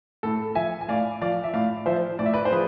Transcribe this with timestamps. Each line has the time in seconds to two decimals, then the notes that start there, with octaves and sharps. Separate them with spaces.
0.23 A2 A4
0.55 F3 E5 G#5
0.81 G#5
0.88 A2 D5 F5
1.22 F3 D5 F5
1.44 E5
1.53 A2 D5 F5
1.86 F3 C5 E5
2.19 A2 D5
2.26 E5
2.34 B4 D5
2.45 C5
2.51 F3 G#4 B4